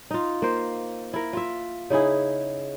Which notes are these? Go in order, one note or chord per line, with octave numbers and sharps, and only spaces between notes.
D#4 F4
A#3 C5
E4 A#4
F4 E5
C#3 D#4 E4 G#4